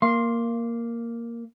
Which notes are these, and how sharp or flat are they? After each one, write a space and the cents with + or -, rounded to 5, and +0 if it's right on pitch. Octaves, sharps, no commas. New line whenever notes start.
A#3 +0 F5 -20 C6 +20